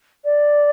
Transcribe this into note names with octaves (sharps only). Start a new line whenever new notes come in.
D5